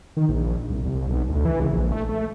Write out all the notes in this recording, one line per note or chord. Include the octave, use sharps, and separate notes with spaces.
D#3
A#1
C2
C2
B1
D2
E3
C#2
A#1
A3
A3